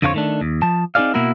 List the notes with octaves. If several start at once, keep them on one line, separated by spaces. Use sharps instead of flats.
F2 D3 F3 F4 A#4 C#5
D#3 A3 D4
D#2
F3 A5
C4 D#4 G4 G#4 D5 F5
B2 A#3 E4 F#4 A#4